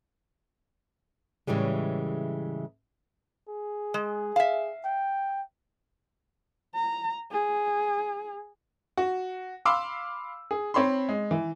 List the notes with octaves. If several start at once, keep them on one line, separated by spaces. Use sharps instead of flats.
A2 C#3 E3 G3 G#3
G#4
G#3
E5 F5
G5
A#5
G#4
F#4
F5 B5 C6 D6 E6
G#4
C4 C#5 B5 C6
G#3
E3